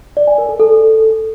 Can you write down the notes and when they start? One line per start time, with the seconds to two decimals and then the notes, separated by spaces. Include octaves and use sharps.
0.17 D5
0.27 G#5
0.38 A#4
0.49 A4
0.60 A4